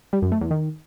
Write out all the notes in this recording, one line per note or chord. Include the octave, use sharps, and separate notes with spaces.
G3
F#2
A3
E2
D#3